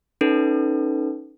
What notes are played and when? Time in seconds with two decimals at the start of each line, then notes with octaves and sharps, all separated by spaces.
0.21 C#4 D#4 A4 B4